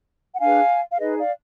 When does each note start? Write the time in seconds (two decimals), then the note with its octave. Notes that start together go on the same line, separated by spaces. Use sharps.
0.34 F#5
0.41 D4 G#4 B4 F5 G#5
0.92 F5
0.99 D#4 G#4 B4 D#5
1.18 D5 F5